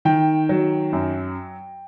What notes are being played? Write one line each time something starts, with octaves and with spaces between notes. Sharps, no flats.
D#3 G5
F#3
F#2